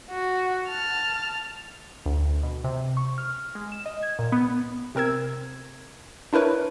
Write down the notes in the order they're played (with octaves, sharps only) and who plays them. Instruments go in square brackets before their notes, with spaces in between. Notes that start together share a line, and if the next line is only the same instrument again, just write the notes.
[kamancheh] F#4
A5 F6
[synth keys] D2
B2
C3
C#6
F6
G#3
E7
D#5
G#6
A#2
B3
[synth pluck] C3 C4 A#4 E6 G#6
D4 E4 A#4 B4 C#5